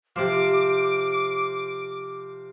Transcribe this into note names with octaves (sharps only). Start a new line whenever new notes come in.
C3 F3 D6